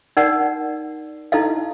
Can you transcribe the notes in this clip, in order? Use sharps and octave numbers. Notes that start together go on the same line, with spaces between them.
D#4 A#4 D5 F#5
D#4 E4 A4 D#5 F5